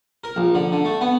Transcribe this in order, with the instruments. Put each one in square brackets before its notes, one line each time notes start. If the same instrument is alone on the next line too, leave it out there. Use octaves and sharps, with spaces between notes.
[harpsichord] A#4
A#1
D3
D3
A3
B3